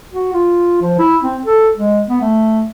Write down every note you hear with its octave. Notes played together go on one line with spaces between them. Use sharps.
F#4
F4
F3
E4
C4
A4
G#3
B3
A3